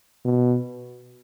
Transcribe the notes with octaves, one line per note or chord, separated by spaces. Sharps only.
B2